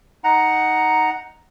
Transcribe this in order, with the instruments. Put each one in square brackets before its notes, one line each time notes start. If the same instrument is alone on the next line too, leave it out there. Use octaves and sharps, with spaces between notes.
[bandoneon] D#4 F#5 A#5